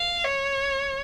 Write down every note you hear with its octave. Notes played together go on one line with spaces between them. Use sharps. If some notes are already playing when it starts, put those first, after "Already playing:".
Already playing: F5
C#5